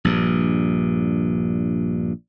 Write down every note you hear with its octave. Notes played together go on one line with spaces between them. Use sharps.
A#1 G2